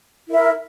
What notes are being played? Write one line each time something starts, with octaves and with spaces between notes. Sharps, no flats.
E4 A#4 E5